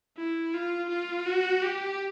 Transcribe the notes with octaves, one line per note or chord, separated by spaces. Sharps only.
E4
F4
F4
F#4
G4